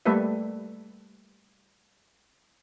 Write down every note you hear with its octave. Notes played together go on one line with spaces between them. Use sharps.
G3 A3 A#3 A4 B4 E5